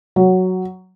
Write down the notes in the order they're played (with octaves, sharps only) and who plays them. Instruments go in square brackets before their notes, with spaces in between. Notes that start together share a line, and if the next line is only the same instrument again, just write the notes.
[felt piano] F#3